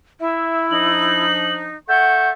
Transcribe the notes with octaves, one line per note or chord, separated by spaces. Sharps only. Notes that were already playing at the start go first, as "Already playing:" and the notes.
E4 E5
F3 D4 D#4 F#7
A4 E5 F#5 C#6 G6